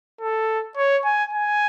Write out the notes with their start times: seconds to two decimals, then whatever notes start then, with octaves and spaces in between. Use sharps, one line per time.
0.21 A4
0.77 C#5
1.05 G#5
1.33 G#5